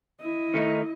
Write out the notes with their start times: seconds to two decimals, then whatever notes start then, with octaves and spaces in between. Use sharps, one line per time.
0.20 E4 D#5
0.54 D#3 A3 D#4